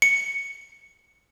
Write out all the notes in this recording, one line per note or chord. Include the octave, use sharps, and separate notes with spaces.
C#7